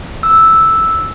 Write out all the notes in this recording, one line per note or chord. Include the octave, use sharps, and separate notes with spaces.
E6